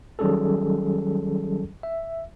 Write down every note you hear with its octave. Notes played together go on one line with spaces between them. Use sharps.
D#3 F#3 G3 C#4 G#4 A4
E5